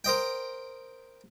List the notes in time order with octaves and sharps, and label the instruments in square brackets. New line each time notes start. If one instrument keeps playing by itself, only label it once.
[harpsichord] A#4 C5 D#5 G5